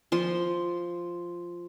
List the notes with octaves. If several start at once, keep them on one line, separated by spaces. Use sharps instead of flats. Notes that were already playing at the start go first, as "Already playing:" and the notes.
F3 C6